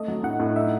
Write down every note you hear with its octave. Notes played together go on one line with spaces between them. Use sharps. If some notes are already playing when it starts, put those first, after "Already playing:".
Already playing: A3 D#5
F#3
A2 F#5
A2
D#4 E5